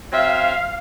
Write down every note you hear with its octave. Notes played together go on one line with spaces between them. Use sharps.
F#3 C4 E5 F5